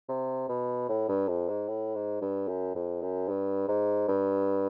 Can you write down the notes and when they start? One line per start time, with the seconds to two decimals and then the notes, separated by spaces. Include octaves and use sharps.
0.09 C3
0.49 B2
0.89 A2
1.09 G2
1.28 F2
1.49 G#2
1.68 A2
1.95 G#2
2.22 G2
2.49 F#2
2.75 F2
3.02 F#2
3.29 G2
3.69 G#2
4.08 G2